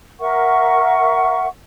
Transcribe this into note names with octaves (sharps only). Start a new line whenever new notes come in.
A#4 E5 F#5 C#6